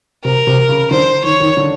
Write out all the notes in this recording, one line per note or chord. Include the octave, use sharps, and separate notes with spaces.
C3 A#4
C3
C#3
D3 C5
D#3 C#5
D#3
D3